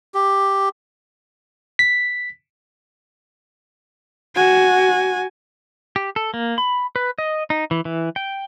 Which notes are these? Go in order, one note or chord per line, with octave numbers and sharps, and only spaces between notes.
G4
B6
F#4 G#5
G4
A4
A#3
B5
B4
D#5
D#4
E3
E3
G5